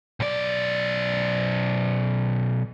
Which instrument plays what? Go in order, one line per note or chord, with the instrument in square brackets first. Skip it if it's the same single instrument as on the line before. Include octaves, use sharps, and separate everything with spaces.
[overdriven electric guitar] B1 D5